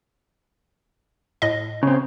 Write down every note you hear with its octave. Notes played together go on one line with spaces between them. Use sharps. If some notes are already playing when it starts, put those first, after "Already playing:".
A2 D#5
C#3 C4